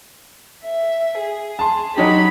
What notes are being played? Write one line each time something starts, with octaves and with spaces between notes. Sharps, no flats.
E5
G#4
A5 C6
F#3 D#4 G4 B5